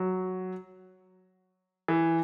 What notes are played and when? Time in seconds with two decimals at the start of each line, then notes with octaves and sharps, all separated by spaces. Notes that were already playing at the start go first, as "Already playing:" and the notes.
Already playing: F#3
1.88 E3